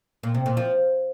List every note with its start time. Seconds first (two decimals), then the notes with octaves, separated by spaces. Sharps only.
0.23 A#2
0.35 C3
0.46 A#2
0.57 F3